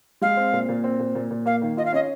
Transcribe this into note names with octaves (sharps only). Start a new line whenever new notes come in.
G#3 F5
C4
A#2
A#2
C4
A#2
A#2
A#2
A#3 F5
D#3
F4 D#5
F5
C#4 D#5